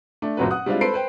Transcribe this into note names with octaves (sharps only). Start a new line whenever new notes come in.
A3 D4
F#1 A#2 F#3 B3 B4
F#5 D#6 F#6
G3 G#3 C4 D4 E4 F4
A4 B4 C5 B5 C7 D7
B4 C5 G5